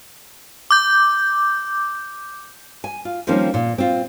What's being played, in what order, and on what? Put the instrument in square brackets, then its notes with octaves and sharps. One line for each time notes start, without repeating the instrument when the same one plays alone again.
[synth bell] D6 G6
[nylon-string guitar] G#5
F4
D#3 F3 G3 A#3 C4 C#4
A#2
C4 F4